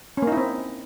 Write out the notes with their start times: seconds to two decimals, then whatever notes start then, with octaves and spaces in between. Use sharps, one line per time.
0.17 C#4
0.22 A#3
0.27 D#4
0.32 E4
0.37 C4